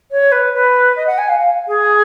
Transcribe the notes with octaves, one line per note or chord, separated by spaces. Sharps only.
C#5
B4
B4
D#5
F#5
G#5
F5
F5
G#4